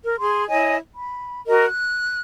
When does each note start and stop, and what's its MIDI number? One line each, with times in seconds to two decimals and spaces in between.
0.04 0.15 70
0.18 0.48 68
0.18 0.48 84
0.48 0.76 64
0.48 0.76 73
0.48 0.76 75
0.48 0.76 80
0.94 1.40 83
1.46 1.65 66
1.46 1.65 70
1.46 1.65 75
1.66 2.21 90